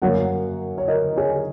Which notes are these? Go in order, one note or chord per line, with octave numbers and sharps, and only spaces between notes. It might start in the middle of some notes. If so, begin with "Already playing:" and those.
F#2 F#3 A#3 C#5 F#5
C#5
A#4 D#5
G#4 C#5